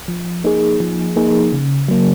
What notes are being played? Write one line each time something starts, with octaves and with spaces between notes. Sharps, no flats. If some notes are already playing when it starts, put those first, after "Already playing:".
F3
A#3 D#4 G#4
F3
A#3 D#4 G#4
C#3
F#3 A#3